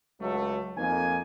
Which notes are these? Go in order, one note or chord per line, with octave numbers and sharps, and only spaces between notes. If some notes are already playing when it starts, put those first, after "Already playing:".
C#2 F#3 A3
F2 A#3 D#4 G#5